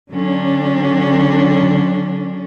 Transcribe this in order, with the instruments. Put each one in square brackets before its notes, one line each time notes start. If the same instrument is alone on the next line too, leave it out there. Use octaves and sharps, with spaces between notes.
[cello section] D3 F#3 C#4 D4